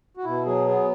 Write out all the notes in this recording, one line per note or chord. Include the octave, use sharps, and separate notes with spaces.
F#4
B2 E4
F#3 G#4
B3 G#4